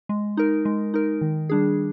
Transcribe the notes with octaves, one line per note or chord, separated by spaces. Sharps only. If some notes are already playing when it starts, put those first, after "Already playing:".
G#3
D#4 A#4
G#3
D#4 A#4
D#3
G3 D4 G#4